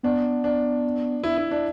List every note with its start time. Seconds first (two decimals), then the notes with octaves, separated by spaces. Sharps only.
0.03 B3 D4
0.44 D4
1.24 E4
1.37 E4
1.51 D4